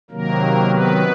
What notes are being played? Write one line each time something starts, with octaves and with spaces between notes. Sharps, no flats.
C3 D#3 F#3 A#3 A#4
B3 B4